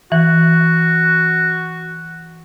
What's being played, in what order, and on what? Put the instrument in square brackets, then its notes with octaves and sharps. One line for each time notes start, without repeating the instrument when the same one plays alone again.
[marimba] E3 [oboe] F#4